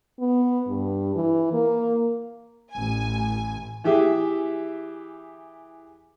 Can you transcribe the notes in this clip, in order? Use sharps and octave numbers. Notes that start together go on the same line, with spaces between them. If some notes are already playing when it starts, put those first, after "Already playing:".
B3
G2
E3
A#3
A1 G#5
E3 G4 G#4 E5